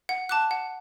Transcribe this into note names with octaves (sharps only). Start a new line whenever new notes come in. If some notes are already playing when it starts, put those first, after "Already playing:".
F#5
A5 D6 F#6
F#5